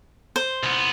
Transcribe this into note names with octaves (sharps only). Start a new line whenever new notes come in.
C5
C2 B3